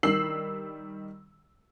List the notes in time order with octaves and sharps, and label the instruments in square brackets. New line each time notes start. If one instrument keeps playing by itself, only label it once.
[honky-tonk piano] D#3 G3 E6 C7 F#7